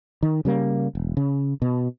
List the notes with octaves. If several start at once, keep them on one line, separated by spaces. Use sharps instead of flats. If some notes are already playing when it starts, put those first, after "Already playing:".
D#3
C#3 G3 A#3
E1
C#3
B2